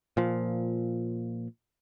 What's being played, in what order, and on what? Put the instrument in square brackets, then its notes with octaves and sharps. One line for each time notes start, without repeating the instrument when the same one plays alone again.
[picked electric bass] A#2 F3